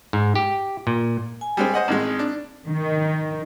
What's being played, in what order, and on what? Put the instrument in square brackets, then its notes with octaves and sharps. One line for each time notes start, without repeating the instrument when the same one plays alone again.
[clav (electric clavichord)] G#2
G4
A#2
[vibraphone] G#5
[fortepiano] G3 G#3 C4
C5 D#5 F#5
[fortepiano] A1 D#3 G#3 [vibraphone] C4 D#4
[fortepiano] D4
[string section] D#3